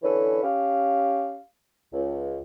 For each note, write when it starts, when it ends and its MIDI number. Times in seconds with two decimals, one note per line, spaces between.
0.03 0.40 50
0.03 0.40 52
0.03 0.40 61
0.03 0.40 69
0.03 0.40 71
0.42 1.39 61
0.42 1.39 67
0.42 1.39 77
1.93 2.38 37